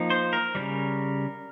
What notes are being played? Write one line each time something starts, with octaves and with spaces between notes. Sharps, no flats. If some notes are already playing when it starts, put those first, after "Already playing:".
Already playing: F3 A#3 D#4
C5
A#4
C#3 E3 G3